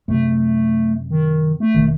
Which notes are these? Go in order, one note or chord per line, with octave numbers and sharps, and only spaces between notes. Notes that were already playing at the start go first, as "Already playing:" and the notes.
F#2 C3 A3
D#3
A3
F1 B2 D#3